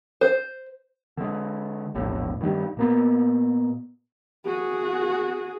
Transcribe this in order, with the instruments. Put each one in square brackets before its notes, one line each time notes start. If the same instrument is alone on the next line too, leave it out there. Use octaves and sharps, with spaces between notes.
[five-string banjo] C5
[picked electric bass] D3 G#3
E1 A#1 A2 A3
G2 D#3 F#3 G3
A#2 A#3 B3
[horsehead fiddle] F#4 G#4